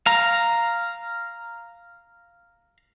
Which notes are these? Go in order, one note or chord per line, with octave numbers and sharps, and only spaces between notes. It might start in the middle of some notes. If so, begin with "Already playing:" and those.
F5 A#5